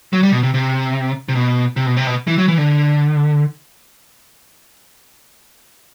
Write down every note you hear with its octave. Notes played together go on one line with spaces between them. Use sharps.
F#3
G3
B2
C3
C3
C3
B2
C3
B2
C3
B2
E3
F#3
E3
D3